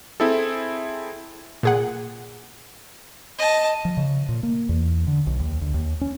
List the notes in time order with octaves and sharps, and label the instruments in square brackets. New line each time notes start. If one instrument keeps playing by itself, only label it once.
[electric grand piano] C4 E4 G#4 A4
[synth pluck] A#2 G#4 F#5
[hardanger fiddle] D#5 A5
[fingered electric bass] F3
C#3
A#2
A#3
E2
D3
B1
D#2
D2
D#2
C#4